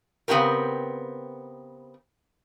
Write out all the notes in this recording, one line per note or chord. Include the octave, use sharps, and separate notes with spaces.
C#3 B3 C4 F#4 G4 A#4